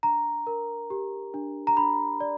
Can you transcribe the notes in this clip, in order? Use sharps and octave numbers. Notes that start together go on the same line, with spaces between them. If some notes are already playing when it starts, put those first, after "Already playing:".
D4 A#5
A#4
G4
D4
A#5
D4 B5
D5